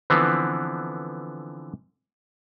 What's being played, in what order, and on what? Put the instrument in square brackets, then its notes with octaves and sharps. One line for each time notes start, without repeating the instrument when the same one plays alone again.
[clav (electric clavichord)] D3 E3 F3 B3 C4